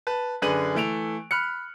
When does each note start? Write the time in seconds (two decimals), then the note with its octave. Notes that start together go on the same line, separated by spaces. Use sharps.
0.07 B4 A5
0.42 F#2 D3 G#4 B4 D#7 F#7
0.75 E3 A3 D7 F7
1.31 B5 F6 F#6 C#7